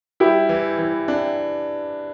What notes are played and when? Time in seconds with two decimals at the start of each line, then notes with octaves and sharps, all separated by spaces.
0.20 G3 E4 G4
0.49 E3
0.79 E3
1.08 D4